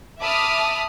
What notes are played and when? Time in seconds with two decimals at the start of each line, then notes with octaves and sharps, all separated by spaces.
0.22 E5 A5 B5 D6 D#6 F6